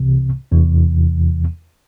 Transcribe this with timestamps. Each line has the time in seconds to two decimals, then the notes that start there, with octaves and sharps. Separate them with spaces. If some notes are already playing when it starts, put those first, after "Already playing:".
Already playing: C2 C3 E3
0.51 E2 C3 E3